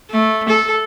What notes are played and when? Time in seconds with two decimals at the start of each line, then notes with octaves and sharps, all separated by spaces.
0.11 A3
0.49 A4